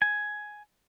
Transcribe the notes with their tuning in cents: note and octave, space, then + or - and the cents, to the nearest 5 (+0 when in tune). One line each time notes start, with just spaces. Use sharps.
G#5 +10